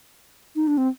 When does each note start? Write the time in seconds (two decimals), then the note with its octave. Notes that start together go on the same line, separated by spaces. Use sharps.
0.56 D#4
0.67 D4
0.78 C4